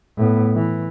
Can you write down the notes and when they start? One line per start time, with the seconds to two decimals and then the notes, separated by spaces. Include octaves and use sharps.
0.17 A2 B3
0.56 E3